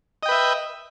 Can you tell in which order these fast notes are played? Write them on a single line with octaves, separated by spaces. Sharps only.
D#5 G5 B4 E5